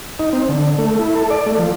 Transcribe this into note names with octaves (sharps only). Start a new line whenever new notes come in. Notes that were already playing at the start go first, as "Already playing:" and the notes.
D#4
C4
D3
A3
E4
A4
D5
A3
F3